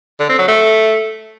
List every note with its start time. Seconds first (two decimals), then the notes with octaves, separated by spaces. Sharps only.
0.20 D3
0.29 C4
0.38 F#3
0.48 A3